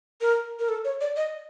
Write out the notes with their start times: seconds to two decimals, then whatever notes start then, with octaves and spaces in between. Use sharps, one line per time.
0.21 A#4
0.59 A#4
0.69 A4
0.85 C#5
1.01 D5
1.16 D#5